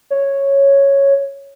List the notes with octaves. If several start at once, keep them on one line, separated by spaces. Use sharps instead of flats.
C#5